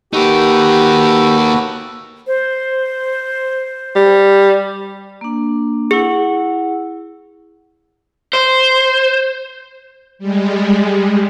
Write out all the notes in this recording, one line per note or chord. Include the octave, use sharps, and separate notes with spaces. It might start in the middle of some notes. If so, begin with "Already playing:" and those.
A#3 D#4 F#4 G4 A4 B4
C5
G3
A#3 D4
E4 G#4 F#5
C5
G3 G#3